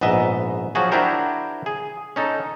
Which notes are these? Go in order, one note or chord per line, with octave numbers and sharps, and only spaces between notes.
A#1 G#2 B3 D#5 E5
F3 F#3 F#4 G#4
D4 E4 F#4 G4 A#4 C5
G#4
C#4 D#4 A4